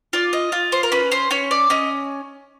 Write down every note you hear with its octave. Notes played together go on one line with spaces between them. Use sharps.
F4 D5
D#5
F4
C5
A#4
C#4 B4
C5
C#4 C#5
D5
C#4 D#5